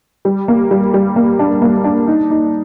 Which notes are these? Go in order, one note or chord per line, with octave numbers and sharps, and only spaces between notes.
G3
A#3
G3
G3
A#3
D4
A#3
D4
D#4
D#4